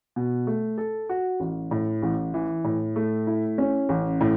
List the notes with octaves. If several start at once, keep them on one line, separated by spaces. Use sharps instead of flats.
B2
A3
A4
F#4
A1
A2
A1
E3
A2
A3
E4
C#4
A1
A2